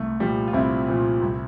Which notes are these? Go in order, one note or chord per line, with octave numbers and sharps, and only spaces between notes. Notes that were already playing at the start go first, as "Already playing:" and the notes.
Already playing: C2 A3
A#2 F3 G3
F4
C2 C4 E4
A#2 F3
C2